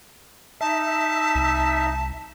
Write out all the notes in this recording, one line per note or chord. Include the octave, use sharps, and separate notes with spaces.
D#4 E5 A5
C2